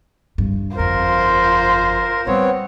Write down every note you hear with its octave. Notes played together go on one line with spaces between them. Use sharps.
G2
G1 F2 F4 A#4 C5
G3 B3 C4 C#5